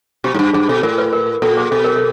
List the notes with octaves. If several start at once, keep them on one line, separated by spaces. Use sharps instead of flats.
B2 G4
G#2
G2
G2 G#4
B2 A4
A2 A#4
B4
A#4
A#2 A4
G#4
B2 A4
A#4
A4